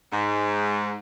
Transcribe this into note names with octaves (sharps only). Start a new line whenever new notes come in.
G#2